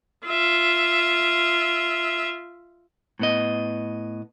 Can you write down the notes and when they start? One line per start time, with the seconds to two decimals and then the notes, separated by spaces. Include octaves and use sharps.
0.27 F4 E5
3.19 A2 B3 D#5